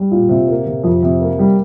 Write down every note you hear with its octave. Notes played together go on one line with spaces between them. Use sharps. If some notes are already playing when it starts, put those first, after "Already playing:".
Already playing: G3
A#2
C3
A#3
C3
F2
C3
A#3
G3